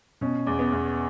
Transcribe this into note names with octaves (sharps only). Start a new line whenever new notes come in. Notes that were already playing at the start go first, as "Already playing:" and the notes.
B2 C#4
E2
B3
E2